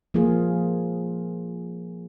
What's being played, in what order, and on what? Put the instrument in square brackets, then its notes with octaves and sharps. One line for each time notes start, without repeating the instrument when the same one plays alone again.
[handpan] F3 A#3 F4 G#4